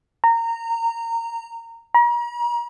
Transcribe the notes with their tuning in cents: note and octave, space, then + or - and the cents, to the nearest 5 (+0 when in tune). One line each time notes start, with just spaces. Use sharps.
A#5 -20
A#5 +40